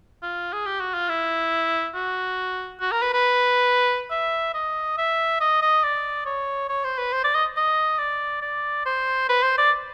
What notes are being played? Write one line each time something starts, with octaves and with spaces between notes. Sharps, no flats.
F4
G#4
G4
F#4
F4
E4
F#4
F#4
A#4
B4
B4
E5
D#5
E5
D#5
D#5
D5
C#5
C#5
C5
B4
C5
D5
D#5
D#5
D5
D5
C5
B4
C5
D5